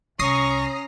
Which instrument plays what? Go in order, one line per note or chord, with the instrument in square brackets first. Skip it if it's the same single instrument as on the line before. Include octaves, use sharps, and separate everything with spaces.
[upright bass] C2 [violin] C#4 A#5 [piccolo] C#6 [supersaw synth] D#6 A#6 C7